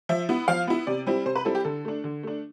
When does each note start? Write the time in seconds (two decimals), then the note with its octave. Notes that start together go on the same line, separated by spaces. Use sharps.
0.09 F3 E5
0.29 B3 E4
0.48 F3 F5
0.67 B3 E4
0.87 C3 D5
1.06 G3 C4 E4
1.25 C3 C5
1.35 B4
1.45 G3 C4 E4 A4
1.55 G4
1.64 D3 A4
1.85 A3 D4
2.04 D3
2.23 A3 D4